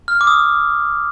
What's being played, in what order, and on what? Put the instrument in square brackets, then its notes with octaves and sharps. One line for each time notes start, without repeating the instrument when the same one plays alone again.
[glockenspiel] F6
D6
D#6